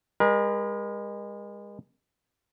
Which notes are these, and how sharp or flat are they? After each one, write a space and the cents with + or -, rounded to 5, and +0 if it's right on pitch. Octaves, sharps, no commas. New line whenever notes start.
G#3 -30 A#4 +40